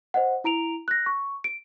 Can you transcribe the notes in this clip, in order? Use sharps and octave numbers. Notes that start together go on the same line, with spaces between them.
C5 D#5 F#5
E4 A#5 D7 F7
F#6 A#6
C#6
D7